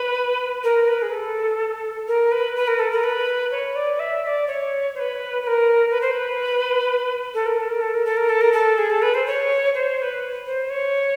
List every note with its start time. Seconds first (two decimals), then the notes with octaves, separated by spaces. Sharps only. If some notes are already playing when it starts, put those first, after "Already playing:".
Already playing: B4
0.64 A#4
0.88 B4
1.02 G#4
1.12 A4
2.08 A#4
2.32 B4
2.56 B4
2.68 A#4
2.79 A4
2.91 A#4
3.03 B4
3.51 C#5
3.76 D5
3.99 E5
4.24 E5
4.27 D5
4.47 C#5
4.95 C5
5.00 B4
5.43 B4
5.47 A#4
5.91 B4
6.01 C5
6.11 B4
7.34 A4
7.46 A#4
7.58 A4
7.69 A#4
7.81 A4
7.94 A#4
8.05 A4
8.17 A#4
8.29 A4
8.41 A#4
8.53 A4
8.78 G#4
8.90 A4
9.02 B4
9.14 C5
9.27 C#5
9.74 C5
9.98 C5
10.02 B4
10.46 C5
10.70 C#5